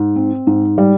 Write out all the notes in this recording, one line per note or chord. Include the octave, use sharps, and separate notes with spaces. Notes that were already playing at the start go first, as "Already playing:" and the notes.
Already playing: G#2
C4
G#2
G3